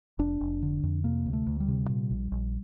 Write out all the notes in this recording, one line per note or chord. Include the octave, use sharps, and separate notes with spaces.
F1 D4
F1
D3
F2
C3 A#3
D2
A3
D2
G3
C3
A#2
A#1
A#1